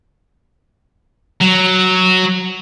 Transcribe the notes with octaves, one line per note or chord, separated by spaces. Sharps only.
F#3